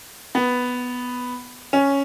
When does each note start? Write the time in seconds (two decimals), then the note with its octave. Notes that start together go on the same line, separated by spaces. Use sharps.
0.35 B3
1.73 C#4